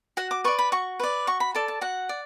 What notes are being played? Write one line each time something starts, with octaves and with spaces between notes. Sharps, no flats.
F#4 F#5
D6
B4 D5 C#6
B5
F#4 C#6
B4 D5
F#4 C#6
B5
A4 D5 A5
A5
F#4 F#5
D5